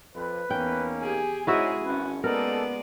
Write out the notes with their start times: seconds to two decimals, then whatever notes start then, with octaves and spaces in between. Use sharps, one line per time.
0.16 F2 B4
0.51 E2 A#3 C#4 D#4 G5
1.02 G4 G#4 G#5
1.47 G#2 G#3 C#4 D#4 E4 F#4 G#4 E5
1.85 G#1 C#4 B4
2.24 G#3 A#3 B3 D#4 A4 A#4 D5